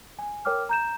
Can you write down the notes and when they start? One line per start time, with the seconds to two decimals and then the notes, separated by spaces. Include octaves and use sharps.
0.19 G#5
0.45 A#4 C#5 G5 D6 F6
0.69 A#5 G6 E7